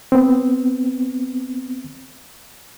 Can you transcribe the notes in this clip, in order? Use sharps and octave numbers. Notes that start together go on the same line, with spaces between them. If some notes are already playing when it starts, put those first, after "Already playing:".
B3 C4